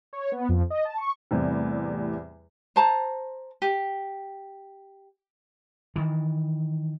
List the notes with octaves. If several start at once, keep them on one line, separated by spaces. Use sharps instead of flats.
C#5
B3
F2
D#5
A5
C#6
E2 A2 C3 G3
C5 A5 A#5
G4
D#3 E3